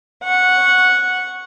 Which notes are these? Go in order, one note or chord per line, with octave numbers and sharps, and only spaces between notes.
F#5 C#6